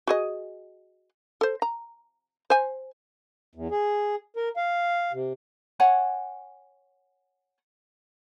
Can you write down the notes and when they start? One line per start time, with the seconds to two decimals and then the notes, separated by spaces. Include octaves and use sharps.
0.07 F#4 G#4 D#5
1.41 A4 C5
1.62 A#5
2.50 C5 G#5
3.55 E2
3.71 G#4
4.36 A#4
4.57 F5
5.13 C3
5.80 C#5 F#5 G#5